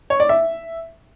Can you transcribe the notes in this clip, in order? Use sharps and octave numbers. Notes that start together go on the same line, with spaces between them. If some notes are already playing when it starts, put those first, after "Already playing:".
C#5
D5
E5